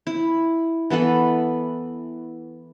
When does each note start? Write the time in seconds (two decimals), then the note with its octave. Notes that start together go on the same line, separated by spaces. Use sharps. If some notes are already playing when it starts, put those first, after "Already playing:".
0.07 E4
0.90 E3 B3 A4 B4